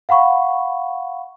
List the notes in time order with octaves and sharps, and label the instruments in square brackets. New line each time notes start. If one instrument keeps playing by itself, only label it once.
[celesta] F5 F#5 B5 C#6